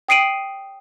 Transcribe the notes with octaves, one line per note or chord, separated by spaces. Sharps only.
G5 D#6 C7 D7 D#7 F#7